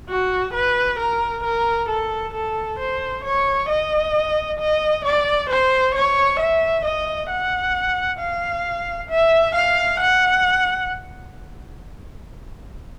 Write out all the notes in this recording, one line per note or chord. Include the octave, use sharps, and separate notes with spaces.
F#4
B4
A#4
A#4
A4
A4
C5
C#5
D#5
D#5
D5
C5
C#5
E5
D#5
F#5
F5
E5
F5
F#5